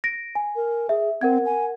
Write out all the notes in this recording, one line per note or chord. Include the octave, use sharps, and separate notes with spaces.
A#6 D7
G#5
A#4
G#4 E5
C4 A#4 F#5 G#6
G#5